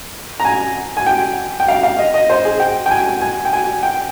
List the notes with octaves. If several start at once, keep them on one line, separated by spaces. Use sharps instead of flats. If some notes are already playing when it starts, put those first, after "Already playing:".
A#5
G#5
G#5
G5
G5
F5
F5
D#5
D#5
C5
G#4
G5
G5
G#5
G#5
G#5
G5
G#5
G5